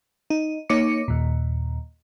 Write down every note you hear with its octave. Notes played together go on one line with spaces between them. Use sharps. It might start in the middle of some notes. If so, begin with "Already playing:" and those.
D#4
A#3 D#4 C#5 D6 C#7
D#2 A#2